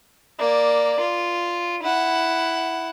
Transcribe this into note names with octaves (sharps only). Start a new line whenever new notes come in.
A#3 D5
F4
E4 F#5